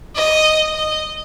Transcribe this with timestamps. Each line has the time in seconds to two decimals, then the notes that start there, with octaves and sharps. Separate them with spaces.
0.15 D#5
0.75 D#5